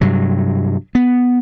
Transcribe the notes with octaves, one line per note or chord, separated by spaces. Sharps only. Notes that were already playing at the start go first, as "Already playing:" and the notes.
G2 C3 F#3
B3